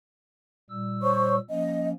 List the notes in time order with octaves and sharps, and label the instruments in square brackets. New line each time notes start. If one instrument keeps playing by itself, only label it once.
[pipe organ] A#2 G3 E6
[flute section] C5 C#5 C#6
[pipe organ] F3 A#3 C#4 [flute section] D#5